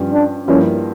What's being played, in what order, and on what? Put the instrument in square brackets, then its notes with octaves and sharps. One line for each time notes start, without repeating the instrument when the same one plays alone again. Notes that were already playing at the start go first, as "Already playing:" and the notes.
Already playing: [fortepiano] G2 F3 C#4 G4
[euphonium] D4
[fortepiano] G2 F3 A#3 E4 [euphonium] C#4